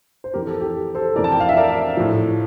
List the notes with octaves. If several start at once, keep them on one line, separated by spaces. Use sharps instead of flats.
C5
F2 E3 G4 A#4
A4
G4
A4 C5
F2 E3 A#4 D5
A5
G5
F5
E5
A#4 D5
A2 F3